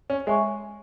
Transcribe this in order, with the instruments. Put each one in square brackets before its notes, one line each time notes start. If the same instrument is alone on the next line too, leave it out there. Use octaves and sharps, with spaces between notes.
[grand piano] C#4
[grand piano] G#3 [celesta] C#5 E5 G#5 C#6